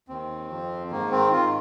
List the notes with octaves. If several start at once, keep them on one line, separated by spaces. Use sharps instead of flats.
D#2 D#3 C4
F2 F3
G#2 D#3 A#3
C4
D#3 F4